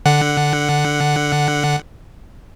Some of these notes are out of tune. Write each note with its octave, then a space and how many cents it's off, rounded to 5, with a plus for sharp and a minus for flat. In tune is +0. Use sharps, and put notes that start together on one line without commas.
D3 +0 F#5 +0